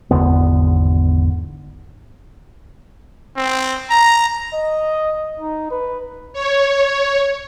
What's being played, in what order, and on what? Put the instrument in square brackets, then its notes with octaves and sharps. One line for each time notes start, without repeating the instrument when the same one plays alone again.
[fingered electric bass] G#1 E2 D3 B3
[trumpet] C4
A#5
[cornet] D#5
D#4
B4
[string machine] C#5